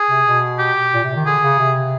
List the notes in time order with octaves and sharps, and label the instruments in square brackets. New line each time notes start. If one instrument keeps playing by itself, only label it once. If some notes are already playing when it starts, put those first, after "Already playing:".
Already playing: [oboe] G#4
[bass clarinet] C3
B2
[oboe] G4
[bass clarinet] A#2
C3
D#3
[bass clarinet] D3 [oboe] G#4
[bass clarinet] C#3
C3